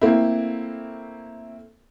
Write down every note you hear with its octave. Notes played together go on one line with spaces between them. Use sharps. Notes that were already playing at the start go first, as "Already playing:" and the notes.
A3 A#3 C4 E4